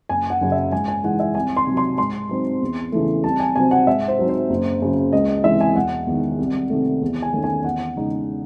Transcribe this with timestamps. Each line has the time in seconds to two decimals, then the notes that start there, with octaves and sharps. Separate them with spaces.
0.09 F#1 G#5
0.30 F#5
0.41 F#2 C#3
0.52 E5
0.72 G#2 G#5
0.88 G#5
1.04 E3 G#3 D#4 F#5
1.20 E5
1.35 C2 G#5
1.57 C6
1.67 C3 F#3
1.77 C6
1.98 G#2 C6
2.29 F#3 C4 D#4
2.61 E2
2.92 C#3 E3 A3
3.24 C2 A5
3.40 G#5
3.56 C3 F#3 C4 G#5
3.71 F#5
3.87 G#2 E5
4.08 C5
4.19 F#3 C4 D#4
4.29 C5
4.50 F#1
4.82 F#2 C#3
5.13 C#2 D#5
5.29 D#5
5.44 C3 E3 G#3 E5
5.61 G#5
5.76 E1 F#5
6.07 E2 D#3
6.38 C2
6.70 C3 D#3 A3
7.02 E2
7.22 G#5
7.33 D#3 A3 C#4
7.44 G#5
7.64 E2 F#5
7.96 C#3 G#3 D#4